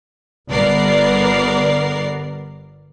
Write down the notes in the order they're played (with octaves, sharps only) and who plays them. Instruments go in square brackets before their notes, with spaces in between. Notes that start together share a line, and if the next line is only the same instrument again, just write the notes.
[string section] G1 B3 A#4 D5 C7